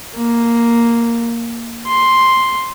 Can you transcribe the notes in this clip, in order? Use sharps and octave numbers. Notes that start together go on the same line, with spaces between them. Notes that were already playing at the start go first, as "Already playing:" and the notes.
A#3
C6